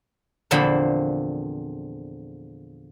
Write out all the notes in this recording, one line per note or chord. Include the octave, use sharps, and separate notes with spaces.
E2 A#2 D3 F3 C4 B5